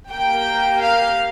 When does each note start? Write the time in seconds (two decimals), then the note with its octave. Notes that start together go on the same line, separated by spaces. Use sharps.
0.10 A#3 G4 G5
0.82 F5